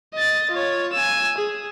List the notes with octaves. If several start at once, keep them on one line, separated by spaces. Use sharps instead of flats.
D#5 A6
F4 C#5
G#5 E6
G#4